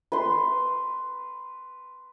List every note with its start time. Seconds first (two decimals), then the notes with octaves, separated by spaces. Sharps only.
0.12 B4 C6